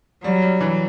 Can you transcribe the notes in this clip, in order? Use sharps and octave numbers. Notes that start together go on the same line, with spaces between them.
F#3 G3
G3
E3